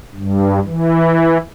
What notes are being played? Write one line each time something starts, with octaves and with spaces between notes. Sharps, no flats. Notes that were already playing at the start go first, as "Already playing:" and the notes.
G2
E3